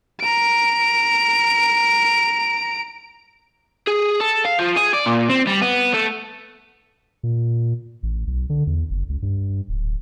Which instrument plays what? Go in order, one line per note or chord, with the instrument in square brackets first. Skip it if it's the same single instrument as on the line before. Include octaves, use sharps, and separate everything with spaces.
[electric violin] A#5 D7
[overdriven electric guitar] G#4
A4
F5
F3
G#4
D5
A#2
C4
G3
B3
A3
[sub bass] A#2
A1
B1
D3
E2
F#1
C#2
G2
D1